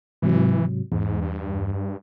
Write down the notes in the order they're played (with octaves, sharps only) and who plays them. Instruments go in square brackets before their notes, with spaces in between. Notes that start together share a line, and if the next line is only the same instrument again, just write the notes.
[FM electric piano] G#2 C3 F#3 [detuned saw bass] E3
[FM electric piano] E2 [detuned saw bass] G#2
[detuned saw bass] G2